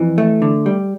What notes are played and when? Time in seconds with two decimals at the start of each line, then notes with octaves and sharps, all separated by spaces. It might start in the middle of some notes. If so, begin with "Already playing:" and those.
Already playing: F2 E3
0.18 A3
0.42 D3
0.66 G3